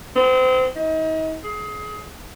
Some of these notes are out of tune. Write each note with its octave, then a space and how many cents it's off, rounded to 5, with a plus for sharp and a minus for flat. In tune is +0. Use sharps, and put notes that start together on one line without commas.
C4 -30
D#4 +35
G#4 +25